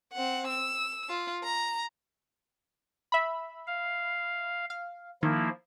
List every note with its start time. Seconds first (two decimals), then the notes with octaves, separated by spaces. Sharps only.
0.13 C4 F#5
0.47 E6
1.09 F4
1.43 A#5
3.12 E5 B5
3.67 F5
4.70 F5
5.23 D#3 F3 A#3 E4